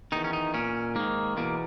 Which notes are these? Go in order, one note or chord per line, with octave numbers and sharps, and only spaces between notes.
E2 D#3 D#4
C#4
D#4
A#2 C#4
G#2 D#3 A#3
E2 B2 A#3